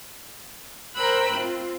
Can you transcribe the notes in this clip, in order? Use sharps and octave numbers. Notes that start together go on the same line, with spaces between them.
A#4 C5 G5 B5 E6 F#6
C4 F4